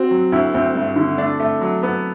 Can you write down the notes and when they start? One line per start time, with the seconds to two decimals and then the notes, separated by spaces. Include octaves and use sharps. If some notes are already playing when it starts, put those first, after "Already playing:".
Already playing: C4 F#4
0.11 F#3
0.32 D2 E4
0.54 D2 C4
0.75 G2
0.96 D3
1.18 A3 D4
1.40 A3
1.61 F#3
1.83 B3